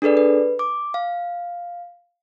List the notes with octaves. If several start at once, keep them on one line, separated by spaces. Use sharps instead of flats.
D4 G#4 A4 B4 D5
B4
D6
F5